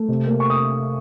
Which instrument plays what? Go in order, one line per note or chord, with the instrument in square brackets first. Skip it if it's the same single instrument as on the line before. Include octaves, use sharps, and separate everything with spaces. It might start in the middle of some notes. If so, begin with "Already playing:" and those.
Already playing: [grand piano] A3
C3
A#3
C#6
D#6